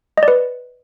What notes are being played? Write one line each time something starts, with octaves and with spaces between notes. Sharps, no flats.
D#5
D5
B4